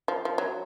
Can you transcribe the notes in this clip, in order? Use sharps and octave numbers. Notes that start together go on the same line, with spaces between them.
F3
F3
F#3